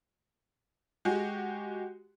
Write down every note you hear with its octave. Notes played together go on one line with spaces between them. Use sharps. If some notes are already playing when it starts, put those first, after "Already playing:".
G#3 F#4 G4